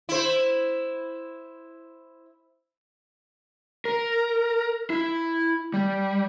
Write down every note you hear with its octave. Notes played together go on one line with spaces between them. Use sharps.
E4 C5
A#4
E4
G3